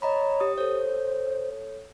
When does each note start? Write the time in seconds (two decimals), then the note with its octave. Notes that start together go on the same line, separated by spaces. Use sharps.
0.02 C#5 D#5 A#5 B5
0.40 G4 D#6
0.58 A4 C5 C#5